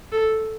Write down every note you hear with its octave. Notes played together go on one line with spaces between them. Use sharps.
A4